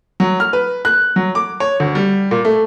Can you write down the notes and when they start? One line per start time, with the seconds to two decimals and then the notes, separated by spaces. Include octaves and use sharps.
0.20 F#3
0.40 F6
0.53 B4
0.85 F#6
1.16 F#3
1.35 D6
1.60 C#5
1.80 D2
1.95 G3
2.31 A#2
2.45 A3